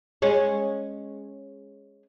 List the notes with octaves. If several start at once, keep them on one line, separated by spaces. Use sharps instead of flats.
G#3 C#4